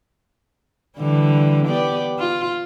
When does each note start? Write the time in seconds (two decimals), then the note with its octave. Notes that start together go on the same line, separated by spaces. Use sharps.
0.98 D3 E3 G3
1.66 B3 G4 D5
2.19 F4